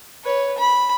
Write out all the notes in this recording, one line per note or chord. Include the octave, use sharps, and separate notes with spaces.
B4 C#5
B5